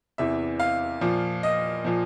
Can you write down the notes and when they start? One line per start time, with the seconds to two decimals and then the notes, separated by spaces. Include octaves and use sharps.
0.18 E2 C3 E3 E5
0.60 F5
1.01 A#2 F3
1.43 D#5
1.84 A#2 F3